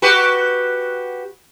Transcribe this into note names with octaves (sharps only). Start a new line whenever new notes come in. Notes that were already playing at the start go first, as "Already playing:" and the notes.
F#4 G4 B4